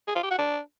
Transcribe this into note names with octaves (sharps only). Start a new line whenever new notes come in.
G#4
F4
G4
F#4
D4